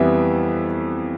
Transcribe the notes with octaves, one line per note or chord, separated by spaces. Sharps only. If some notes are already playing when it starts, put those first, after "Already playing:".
Already playing: F2 E3 G3 B3 E5